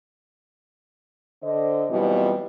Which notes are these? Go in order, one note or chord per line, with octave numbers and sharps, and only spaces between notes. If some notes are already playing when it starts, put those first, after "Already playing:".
D3 C5 D#5
B2 E3 F#3 G3 C4 F4